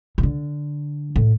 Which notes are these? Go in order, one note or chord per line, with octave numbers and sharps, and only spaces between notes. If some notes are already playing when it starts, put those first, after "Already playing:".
C3
D3
A2